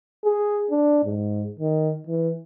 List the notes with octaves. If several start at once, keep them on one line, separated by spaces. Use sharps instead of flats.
G#4
D4
G#2
D#3
E3